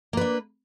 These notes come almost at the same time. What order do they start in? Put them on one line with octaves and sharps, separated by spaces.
A#3 B4 D4